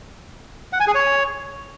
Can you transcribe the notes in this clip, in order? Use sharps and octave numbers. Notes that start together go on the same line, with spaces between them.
F#5
G#5
G#4
C#5